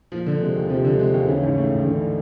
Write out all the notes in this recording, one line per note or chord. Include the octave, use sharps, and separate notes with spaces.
A#2 F3
D3
C3 G#3
D#2
C3 F3
D3
G#3
D#2
C#3 E3
G#2
A3
A1
D3 E3